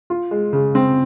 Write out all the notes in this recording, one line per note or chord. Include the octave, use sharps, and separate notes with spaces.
F4
G#3
C#3
C4